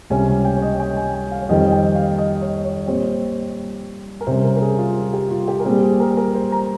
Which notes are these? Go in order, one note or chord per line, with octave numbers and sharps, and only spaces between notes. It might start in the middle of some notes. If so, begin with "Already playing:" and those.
C#2 C3 G3 C#4 G#5
G#5
G5
C#5
D#5
G5
G#5
G#5
F5
C#5
F2 D#3 G3 C4 D#5
G5
F5
D#5
C#5
C#5
A#2 G3 C4
A#4
C3 G3 C#4 C5
A#4
A#4
G#4
F4
G4
F4
G4
A#4
A#2 G3 C4 G#4
G#4
A#4
A#4
C5
A#5